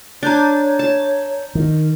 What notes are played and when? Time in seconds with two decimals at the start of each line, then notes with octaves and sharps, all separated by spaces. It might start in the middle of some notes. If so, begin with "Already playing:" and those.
0.23 D4 C#5 A#5 G6 A6
0.79 A5
1.55 D#3 A#4